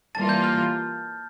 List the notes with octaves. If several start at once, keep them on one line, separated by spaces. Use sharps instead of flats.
E3 G3 A#3 F4 A5 A6
G6
F6